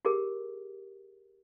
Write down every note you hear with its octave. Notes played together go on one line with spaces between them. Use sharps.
G4 G#4 A#4